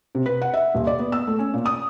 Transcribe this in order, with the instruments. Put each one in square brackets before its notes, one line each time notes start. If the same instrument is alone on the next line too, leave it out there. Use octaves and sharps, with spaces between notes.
[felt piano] C3
B4
F#5
E5
D#1
D5
B3
E6
A3
C#4
A#2
D#6